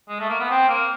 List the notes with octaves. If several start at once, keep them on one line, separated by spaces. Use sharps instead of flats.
G#3
A3
A#3
B3
C4
A#3